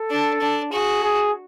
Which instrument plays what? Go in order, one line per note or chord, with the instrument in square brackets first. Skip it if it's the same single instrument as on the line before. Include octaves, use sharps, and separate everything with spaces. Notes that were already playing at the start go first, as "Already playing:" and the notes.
Already playing: [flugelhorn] A4
[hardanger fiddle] D4
D4
[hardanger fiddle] F#4 [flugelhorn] G#4
[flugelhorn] G#4